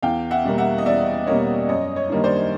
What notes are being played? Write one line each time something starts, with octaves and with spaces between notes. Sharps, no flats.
E2 F5 G5
E5 F#5
B2 G3 A#3
E5 F#5
D#5
E2 D5 E5
B2 G3 A#3 C#5 D#5
F#2 C#5 D#5
C#5 D#5
D#3 G3 A#3 D4
C5 D5